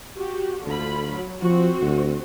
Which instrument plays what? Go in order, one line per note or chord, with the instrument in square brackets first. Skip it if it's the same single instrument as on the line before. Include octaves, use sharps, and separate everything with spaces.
[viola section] F#4 G4
[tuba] D2 [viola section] D3 F4 B5
[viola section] F#3
[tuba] F3 [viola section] C4 F#4
[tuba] D2